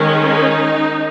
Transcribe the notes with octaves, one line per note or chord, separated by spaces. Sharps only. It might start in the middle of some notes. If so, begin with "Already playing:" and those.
Already playing: D#3 G#3 C#4
D#4